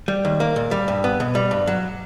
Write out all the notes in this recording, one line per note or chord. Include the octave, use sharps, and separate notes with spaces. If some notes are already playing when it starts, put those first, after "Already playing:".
G3
D#2
A#3
A#2
G3
G2
B3
B2
G3
G2
F#3